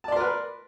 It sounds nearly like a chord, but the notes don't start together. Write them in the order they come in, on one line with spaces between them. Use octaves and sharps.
A5 D5 C6 A#4 B4